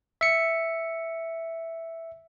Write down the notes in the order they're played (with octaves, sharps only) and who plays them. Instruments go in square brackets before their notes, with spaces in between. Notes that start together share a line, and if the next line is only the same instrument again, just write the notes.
[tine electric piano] E5 C#7